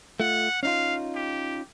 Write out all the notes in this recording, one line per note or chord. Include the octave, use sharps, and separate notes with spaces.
A3 F4 F#5
C#4 D#4 F4 F5
G4